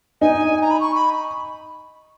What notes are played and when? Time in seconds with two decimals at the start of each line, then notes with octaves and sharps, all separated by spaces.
0.21 D#4 G#5
0.62 A#5
0.71 B5
0.80 C#6
0.95 B5